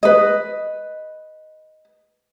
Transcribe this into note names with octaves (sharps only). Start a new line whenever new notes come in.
B4 D#5